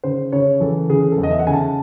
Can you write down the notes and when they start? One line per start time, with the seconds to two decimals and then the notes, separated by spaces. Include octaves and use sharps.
0.03 C#3 C5
0.32 C#3 C#5
0.60 E3 A4
0.89 C#3 G#4
1.11 A4
1.18 E2
1.23 D#5
1.31 E5
1.39 F#5
1.47 C#3 G#5
1.53 A5